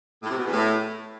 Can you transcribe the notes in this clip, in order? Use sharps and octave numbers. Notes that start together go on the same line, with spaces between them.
A2
C3
B2
E2
A2